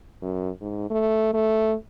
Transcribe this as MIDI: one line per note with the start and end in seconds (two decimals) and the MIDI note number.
0.22 0.50 42
0.61 0.86 44
0.90 1.33 57
1.33 1.74 57